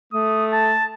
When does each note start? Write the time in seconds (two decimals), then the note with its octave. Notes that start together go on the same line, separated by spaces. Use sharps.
0.13 A3 D#6
0.53 A5